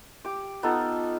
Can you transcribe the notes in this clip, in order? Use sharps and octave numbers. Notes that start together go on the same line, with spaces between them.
G4 D6
B3 D#4 F4 A4